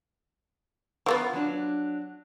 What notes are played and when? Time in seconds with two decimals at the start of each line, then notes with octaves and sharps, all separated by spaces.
1.06 F3 A#3 B3 F4
1.33 F#3 D4